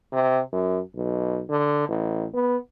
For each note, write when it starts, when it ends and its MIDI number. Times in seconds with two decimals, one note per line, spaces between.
0.12 0.41 48
0.53 0.79 42
0.96 1.42 35
1.49 1.84 50
1.88 2.25 33
2.34 2.56 59